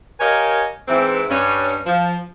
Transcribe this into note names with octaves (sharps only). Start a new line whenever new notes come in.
G4 A#4 C#5 D#5 F5 G#5
G#2 E3 C4
G2 C#4
F3